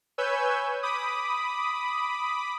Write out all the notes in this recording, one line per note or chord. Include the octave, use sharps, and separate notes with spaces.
B4 C#5 G#5 E6 G6
B5 D6 D#6